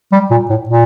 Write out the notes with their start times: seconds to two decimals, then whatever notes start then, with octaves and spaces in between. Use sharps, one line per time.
0.12 G3
0.31 A#2
0.49 A2
0.69 A#2